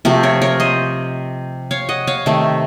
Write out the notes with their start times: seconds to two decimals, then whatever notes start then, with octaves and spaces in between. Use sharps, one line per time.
0.05 C3 F3 A3 F#4 A#4
0.23 A#4 C#5
0.42 A#4 C#5
0.60 C5 D#5
1.71 C#5 F5
1.89 D#5 F#5
2.07 C#5 F5
2.26 C3 D#3 A3